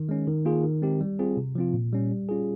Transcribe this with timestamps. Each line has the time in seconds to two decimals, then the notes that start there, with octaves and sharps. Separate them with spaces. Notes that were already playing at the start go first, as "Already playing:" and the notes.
Already playing: D#3
0.09 G#3 C#4
0.27 D#3
0.45 A#3 F4 G#4
0.63 D#3
0.82 G#3 C4 D#4 G4
1.01 G3
1.19 C4 F4 G#4
1.37 C3
1.55 F3 C4 F4
1.74 A#2
1.93 G3 C#4
2.11 G3
2.29 C#4 F4 G#4